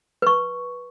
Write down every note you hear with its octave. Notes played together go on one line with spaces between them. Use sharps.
B4 C#6